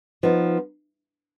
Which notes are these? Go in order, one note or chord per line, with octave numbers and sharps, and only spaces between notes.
F3 B3 D#4